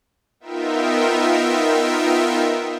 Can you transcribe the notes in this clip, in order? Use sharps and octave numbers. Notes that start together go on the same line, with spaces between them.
B3 D#4 F4 A#4 E5 G5